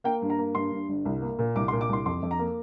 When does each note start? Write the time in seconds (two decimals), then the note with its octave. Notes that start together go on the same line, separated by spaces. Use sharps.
0.04 A#3 G5
0.22 G2
0.30 A#5
0.39 A#3
0.55 G2 C6
0.72 G2
0.89 G1
1.05 C2
1.22 A#3
1.39 A#2
1.55 C2 D6
1.68 C6
1.72 A#2
1.81 D6
1.89 C2 C6
2.06 F2 C6
2.23 F2
2.31 A#5
2.39 A#3